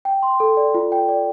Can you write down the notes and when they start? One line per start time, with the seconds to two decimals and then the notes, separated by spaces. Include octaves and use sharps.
0.05 G5
0.23 C6
0.40 A4
0.57 D5
0.74 F4
0.92 G5
1.08 D5